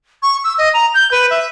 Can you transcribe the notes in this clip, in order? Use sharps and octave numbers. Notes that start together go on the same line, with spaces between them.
C#6
E6
D#5
A#5
G6
B4
E5